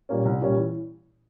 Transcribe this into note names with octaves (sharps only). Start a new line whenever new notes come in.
A#2 G3 A#3 C#4
C2
A#2 G3 A#3 C#4
E3